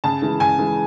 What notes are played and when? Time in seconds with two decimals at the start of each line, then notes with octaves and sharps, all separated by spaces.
0.04 C#3 A5
0.22 E3 G#3
0.40 C#3 G#5
0.59 E3 G#3